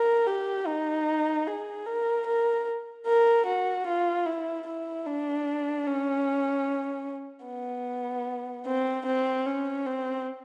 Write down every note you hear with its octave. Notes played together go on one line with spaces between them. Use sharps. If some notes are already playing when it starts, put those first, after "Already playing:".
Already playing: A#4
G4
D#4
G#4
A#4
A#4
A#4
F#4
F4
E4
E4
D4
C#4
B3
C4
C4
C#4
C4